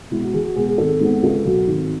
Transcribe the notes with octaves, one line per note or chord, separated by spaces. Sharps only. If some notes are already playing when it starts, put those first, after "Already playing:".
B2 G#3 B3 E4
F#4
E2 G#4
F#4
B2 G#3 B3 G#4
G#4
G#1 A4
G#2 G#3 B3
C#2 A4
B2 F#3
G#1